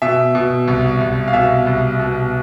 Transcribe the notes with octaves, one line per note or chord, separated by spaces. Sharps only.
B2 E5
B2
C2
C2
F5
B2 E5
C2
B2